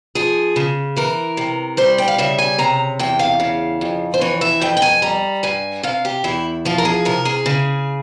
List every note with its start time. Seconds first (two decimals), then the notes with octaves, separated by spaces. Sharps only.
0.15 F3 G#4
0.56 C#3
0.96 E3 A#4
1.37 C3
1.77 G3 C5
1.98 G5
2.08 F5
2.18 C#3 E5
2.38 G#5
2.58 C3 A#5
2.99 E2 G5
3.19 F5
3.40 C#3
3.81 F2
4.14 C5
4.21 E3 C#5
4.41 E5
4.61 F2 G5
4.77 G5
4.82 G#5
5.02 G3 A#5
5.43 G2 G#5
5.83 C3 F5
6.05 G4
6.24 E2 E4
6.65 F3 F4
6.78 A#4
6.85 G#4
7.05 C3 A#4
7.25 G#4
7.46 C#3